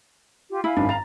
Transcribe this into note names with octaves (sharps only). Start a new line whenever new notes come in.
F4 G4
E4 F5 G#5 B5
G#1 F#2 D#3 D4
A#5 A6 F7